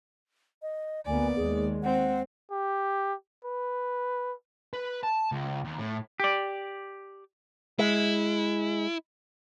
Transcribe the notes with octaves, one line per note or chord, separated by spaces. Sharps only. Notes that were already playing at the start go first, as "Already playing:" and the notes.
D#5
D2 A#3 B3 D5 G#5
D#2 G#3 G#4
C4 F#5
G4
B4
B4
A5
C#2
D#2
A2
G4 D5
G#3 E4